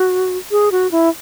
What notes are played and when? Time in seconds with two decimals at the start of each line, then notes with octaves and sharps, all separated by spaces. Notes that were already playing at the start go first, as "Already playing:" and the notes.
Already playing: F#4
0.51 G#4
0.72 F#4
0.91 E4